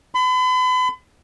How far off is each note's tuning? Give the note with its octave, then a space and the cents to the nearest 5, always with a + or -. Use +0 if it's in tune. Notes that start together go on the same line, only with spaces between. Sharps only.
B5 +40